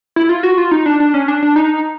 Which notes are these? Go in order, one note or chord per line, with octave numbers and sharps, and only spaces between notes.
E4
F4
F#4
F4
D#4
D4
D4
C#4
D4
D4
D#4